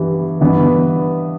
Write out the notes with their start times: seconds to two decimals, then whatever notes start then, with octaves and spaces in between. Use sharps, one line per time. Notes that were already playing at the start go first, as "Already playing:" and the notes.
Already playing: G2 E3 G3 B3
0.41 G2 E3 B3